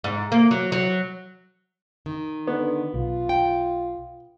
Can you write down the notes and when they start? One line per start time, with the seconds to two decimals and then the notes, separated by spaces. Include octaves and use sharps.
0.04 G#2
0.32 A#3
0.51 F#3
0.72 F#3
2.06 D#3
2.47 D3 B3
2.94 B1 F4
3.29 G5